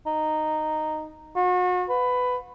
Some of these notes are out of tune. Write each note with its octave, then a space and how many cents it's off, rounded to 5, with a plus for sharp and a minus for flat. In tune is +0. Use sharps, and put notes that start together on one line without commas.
D#4 -10
F#4 -40
B4 +15